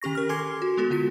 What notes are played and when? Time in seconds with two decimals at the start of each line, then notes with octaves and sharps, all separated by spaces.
0.02 D#3 C#4 G4 C#6 A#6
0.15 A#4 F6
0.29 A4 G#5 C6 D6 G#6 C7
0.62 F#4
0.77 G#3 B3 F#4 A4
0.90 D3 F4 F#4 B6